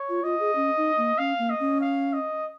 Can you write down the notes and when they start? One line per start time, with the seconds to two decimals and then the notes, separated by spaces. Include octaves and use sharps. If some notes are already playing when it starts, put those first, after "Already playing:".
Already playing: C#5
0.09 F4
0.24 F4 D#5
0.40 G#4
0.56 C#4
0.77 D#4
0.97 A#3
1.18 C#4 F5
1.39 A#3
1.50 D#5
1.60 C#4
1.81 F5
2.13 D#5